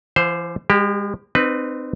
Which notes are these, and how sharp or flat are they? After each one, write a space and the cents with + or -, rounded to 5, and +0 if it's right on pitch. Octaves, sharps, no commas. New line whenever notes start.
E3 +40 C5 +0 F5 +35
G#3 -40 G4 +0
C4 -15 D#4 -35 B4 +0